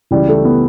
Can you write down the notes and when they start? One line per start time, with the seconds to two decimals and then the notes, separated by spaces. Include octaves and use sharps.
0.11 C#2 C#3 E3 G3
0.29 A3
0.45 B3